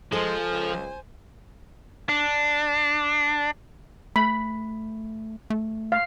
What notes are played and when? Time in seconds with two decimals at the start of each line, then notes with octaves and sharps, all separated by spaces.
0.12 F3 G#3 A4 C5 G#5 A5
0.51 C#2
2.09 D4
4.16 A3 B5
5.50 A3
5.92 F5